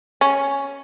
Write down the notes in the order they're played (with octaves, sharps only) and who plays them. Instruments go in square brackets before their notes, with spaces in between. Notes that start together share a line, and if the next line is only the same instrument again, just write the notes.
[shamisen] C#4